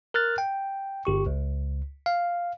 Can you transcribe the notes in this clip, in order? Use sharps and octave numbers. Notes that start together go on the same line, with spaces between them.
A#4 F6 F#6 A6
G5
G1 G4 C#6
C#2
F5